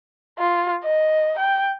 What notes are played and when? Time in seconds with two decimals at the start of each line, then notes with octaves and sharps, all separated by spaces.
0.39 F4
0.83 D#5
1.39 G5